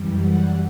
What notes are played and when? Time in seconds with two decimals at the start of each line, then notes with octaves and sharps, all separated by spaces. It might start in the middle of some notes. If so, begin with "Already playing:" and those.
Already playing: F#2 E3 G3
0.16 F#5